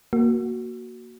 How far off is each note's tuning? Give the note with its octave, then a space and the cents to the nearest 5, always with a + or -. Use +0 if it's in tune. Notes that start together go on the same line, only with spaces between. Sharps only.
A#3 +0 F#4 +0